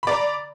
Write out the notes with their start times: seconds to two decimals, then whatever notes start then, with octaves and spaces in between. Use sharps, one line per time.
0.03 B5
0.07 D5
0.11 A#5